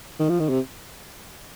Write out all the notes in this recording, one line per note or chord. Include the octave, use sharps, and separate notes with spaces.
D#3
F3
D#3
C3